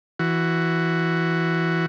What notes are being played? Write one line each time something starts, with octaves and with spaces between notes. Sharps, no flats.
E3 F#4